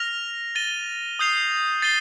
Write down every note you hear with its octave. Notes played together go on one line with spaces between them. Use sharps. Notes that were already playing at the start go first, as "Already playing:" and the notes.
Already playing: F6 A#6 F7
A6 D#7 G7
D#6 G6 C7 F7
A6 C7 D#7 G7